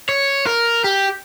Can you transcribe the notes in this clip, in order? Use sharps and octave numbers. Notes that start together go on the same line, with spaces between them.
C#5
A#4
G4